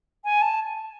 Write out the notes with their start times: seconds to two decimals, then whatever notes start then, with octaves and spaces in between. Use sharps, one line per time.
0.24 G#5
0.41 A5